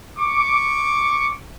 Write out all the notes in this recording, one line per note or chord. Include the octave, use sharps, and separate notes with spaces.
C#6 D6